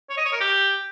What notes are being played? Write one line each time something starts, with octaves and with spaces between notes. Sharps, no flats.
C#5
D#5
C#5
A#4
G4